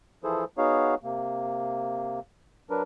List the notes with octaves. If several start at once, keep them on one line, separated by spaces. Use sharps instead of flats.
E3 F3 E4 G#4 A4 C5
B3 D#4 F#4 G#4 C#5 F5
C3 A#3
F#3 D4 A#4 B4